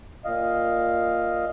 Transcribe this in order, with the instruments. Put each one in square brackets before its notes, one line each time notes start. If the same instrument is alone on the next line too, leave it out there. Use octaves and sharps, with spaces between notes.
[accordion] A#2 D#5 F5